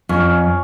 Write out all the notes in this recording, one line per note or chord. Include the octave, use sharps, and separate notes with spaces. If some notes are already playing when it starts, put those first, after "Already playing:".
F2 C#4